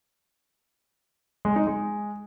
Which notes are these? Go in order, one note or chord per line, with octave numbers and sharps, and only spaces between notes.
G#3
D#4
G#3